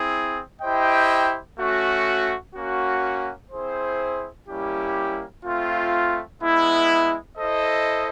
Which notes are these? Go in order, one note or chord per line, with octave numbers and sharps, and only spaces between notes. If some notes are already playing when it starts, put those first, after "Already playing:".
Already playing: C4 E4 G#4
E4 G4 C5 D#5 G5
A3 C#4 F#4
A#3 C#4 F#4
C4 E4 G#4 C5
G3 A#3 C#4 E4 G4
A3 C4 F4
G#3 B3 E4
E4 A4 C5 D#5